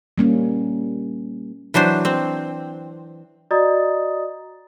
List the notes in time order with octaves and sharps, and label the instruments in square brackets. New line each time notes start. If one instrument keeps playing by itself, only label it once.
[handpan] G3 A#3 C#4
[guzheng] E3 F#3 D4 C5
C4
[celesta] F#4 D5 D#5 A#5 D#6 A6